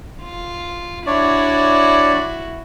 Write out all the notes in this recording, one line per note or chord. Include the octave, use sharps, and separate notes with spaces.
F4
D4 E4 F#4 C#5 D5